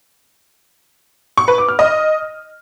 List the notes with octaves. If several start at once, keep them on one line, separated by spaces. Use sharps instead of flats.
C#6
B4
D6
F6
D#5